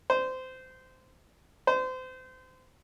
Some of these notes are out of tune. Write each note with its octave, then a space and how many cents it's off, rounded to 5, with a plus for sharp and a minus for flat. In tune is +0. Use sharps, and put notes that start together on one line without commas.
C5 -20
C5 -30